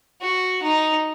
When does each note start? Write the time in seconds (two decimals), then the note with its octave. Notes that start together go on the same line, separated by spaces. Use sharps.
0.21 F#4
0.63 D#4